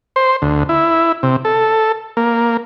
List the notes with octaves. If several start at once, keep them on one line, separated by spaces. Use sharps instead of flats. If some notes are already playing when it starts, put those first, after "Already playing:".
C5
D2
E4
C3
A4
A#3